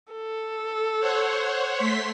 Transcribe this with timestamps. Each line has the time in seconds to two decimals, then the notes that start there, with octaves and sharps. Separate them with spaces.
0.13 A4
1.00 C5 C#5 F#5
1.77 A3 C6 B6